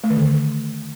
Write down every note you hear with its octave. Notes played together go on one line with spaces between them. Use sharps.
A3
D#3
D3